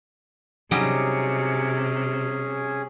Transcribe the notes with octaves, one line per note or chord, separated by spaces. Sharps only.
C3 F#3 G3 C#4 D#4 G#4